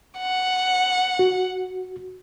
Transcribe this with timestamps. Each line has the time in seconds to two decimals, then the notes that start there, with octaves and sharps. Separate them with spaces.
0.19 F#5
1.19 F#4